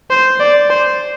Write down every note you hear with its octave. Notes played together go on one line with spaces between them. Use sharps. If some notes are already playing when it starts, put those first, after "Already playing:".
C5
D5
C5